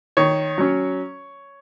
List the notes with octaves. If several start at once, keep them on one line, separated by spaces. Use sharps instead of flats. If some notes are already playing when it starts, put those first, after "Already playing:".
D#3 C#5
F#3 C#4